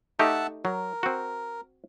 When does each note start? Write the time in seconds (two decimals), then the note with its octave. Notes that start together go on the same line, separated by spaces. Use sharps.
0.19 A3 D#4 G4 E5 F#5 A5
0.65 F#3 A#4
1.03 C4 F#4